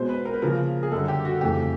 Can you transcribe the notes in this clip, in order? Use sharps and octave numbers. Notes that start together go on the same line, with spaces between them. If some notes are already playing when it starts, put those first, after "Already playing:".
Already playing: B2 G#3 B3 C5
B4
A#4
B4
C#3 F3 A#3 A#4
G#4
F#2 D3 G3 A4
G4
F#4
F2 C#3 E3 A3 G4